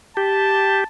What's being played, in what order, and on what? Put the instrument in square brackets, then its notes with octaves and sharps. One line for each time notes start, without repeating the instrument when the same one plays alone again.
[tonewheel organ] G4 [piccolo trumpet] A5